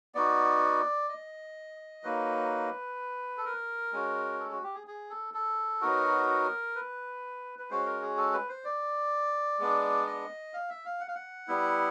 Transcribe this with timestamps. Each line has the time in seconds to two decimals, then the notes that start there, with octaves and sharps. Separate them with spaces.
0.15 B3 D#4 F#4 D5
1.09 D#5
2.04 F#3 A#3 D#4 B4
3.38 A4
3.45 A#4
3.93 G#3 C#4 F#4
4.40 A4
4.51 F#4
4.63 G4
4.75 G#4
4.87 G#4
5.10 A4
5.34 A4
5.81 F#3 B3 D#4 F#4 A#4
6.76 B4
7.59 B4
7.70 G#3 C#4 F#4 C5
7.86 A#4
8.02 G#4
8.17 A4
8.33 B4
8.49 C5
8.65 D5
9.59 G#3 B3 D4
10.06 D#5
10.54 F5
10.70 E5
10.86 F5
11.00 F#5
11.08 F5
11.15 F#5
11.48 G3 B3 E4